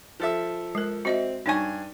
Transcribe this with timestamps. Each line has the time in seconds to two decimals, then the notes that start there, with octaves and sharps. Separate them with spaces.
0.20 F3 A4 E5
0.75 G#3 A#4
1.05 C4 F#4 D#5 E5
1.46 G2 D#4 C#5 G#5 C#6